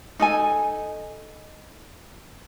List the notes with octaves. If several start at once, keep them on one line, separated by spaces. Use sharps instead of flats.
D#4 A4 G#5